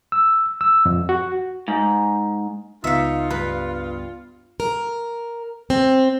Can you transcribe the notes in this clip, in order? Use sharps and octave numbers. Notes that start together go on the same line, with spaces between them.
E6
E6
F2
F#4
G#2
C#2 B3 D#4 F4 E5 F5 C#7
G2 B4
A#4
C4